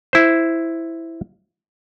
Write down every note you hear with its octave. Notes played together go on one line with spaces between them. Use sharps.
E4 C5